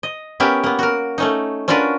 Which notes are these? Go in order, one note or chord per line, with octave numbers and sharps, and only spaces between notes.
D#5
B3 C#4 G4 A#4 E5
A#3 B3
F#4 A#4
A3 C#4 D#4
C#4 D4 F4 F#4 A#4 B4